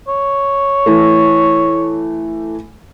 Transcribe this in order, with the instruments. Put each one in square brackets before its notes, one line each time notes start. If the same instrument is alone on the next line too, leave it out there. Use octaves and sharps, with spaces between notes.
[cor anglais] C#5
[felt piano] E3 A3